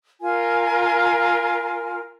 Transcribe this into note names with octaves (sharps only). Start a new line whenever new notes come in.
F4 A#4 G#5